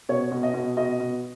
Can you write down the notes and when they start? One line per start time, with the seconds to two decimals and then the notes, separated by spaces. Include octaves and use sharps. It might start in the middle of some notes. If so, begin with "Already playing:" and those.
0.09 B2 C#5
0.31 B2
0.43 D#5
0.54 B2
0.77 B2 D#5
1.00 B2